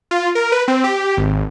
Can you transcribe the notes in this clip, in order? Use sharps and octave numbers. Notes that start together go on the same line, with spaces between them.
F4
A#4
B4
C4
G4
G#1